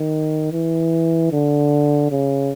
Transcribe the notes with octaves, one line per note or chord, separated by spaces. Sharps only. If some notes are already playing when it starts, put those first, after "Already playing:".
Already playing: D#3
E3
D3
C#3